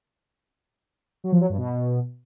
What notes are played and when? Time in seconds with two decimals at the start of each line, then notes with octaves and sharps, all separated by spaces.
1.24 F#3
1.32 F3
1.41 F#3
1.49 G2
1.58 B2